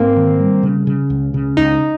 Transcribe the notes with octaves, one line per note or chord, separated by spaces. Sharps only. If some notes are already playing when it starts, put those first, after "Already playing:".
Already playing: G#2 A#3 C4
D#3
G3
C#3
C#3
C#2
C#3
C#2 D#4